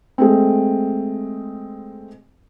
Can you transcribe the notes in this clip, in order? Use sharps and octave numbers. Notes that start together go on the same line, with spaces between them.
G#3 A3 C4